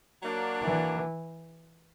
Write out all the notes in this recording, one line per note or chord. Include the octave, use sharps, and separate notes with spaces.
F#3 A#3 D4
E3